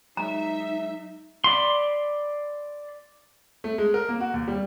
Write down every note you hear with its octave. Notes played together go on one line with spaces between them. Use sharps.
F#3 G#3 D#4 E5 A#5
D5 B5 C6
A3
G#3
A#4
A#3
F#4
D#2
G3